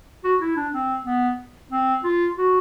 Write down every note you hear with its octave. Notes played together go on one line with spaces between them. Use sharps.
F#4
E4
D4
C4
B3
C4
F4
F#4